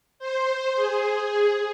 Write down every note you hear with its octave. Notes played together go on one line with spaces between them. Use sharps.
C5
G#4